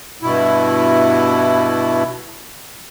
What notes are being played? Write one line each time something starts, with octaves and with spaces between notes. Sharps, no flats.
G2 B2 E4